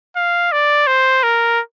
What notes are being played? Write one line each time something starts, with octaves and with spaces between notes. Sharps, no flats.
F5
D5
C5
A#4